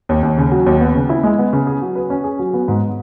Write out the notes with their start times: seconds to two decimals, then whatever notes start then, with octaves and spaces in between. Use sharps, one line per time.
0.09 D#2
0.23 D#2
0.38 C#3
0.52 F#3
0.66 D#2
0.80 B3
0.95 C#3
1.09 E4
1.23 G#3
1.38 B3
1.53 C#3
1.67 G#4
1.82 F#3
1.95 B4
2.10 C#4
2.24 G#4
2.39 F#3
2.54 B3
2.68 G#2